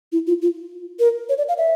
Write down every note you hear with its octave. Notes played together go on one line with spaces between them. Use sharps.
E4
F4
F4
A#4
C#5
D5
F5
E5